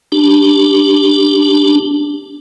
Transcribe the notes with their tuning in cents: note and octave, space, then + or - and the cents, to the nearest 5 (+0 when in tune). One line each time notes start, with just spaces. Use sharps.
D4 +0 G4 +0